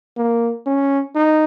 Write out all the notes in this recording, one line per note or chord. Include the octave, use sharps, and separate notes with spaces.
A#3
C#4
D#4